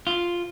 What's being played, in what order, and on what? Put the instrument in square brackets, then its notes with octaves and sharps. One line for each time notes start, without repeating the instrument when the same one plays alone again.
[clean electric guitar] F4